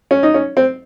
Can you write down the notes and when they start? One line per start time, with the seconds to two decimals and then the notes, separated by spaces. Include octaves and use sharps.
0.11 C#4
0.23 D#4
0.34 C#4
0.57 C4